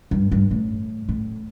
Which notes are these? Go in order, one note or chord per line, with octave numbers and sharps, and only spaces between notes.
G2
G2
A2
A2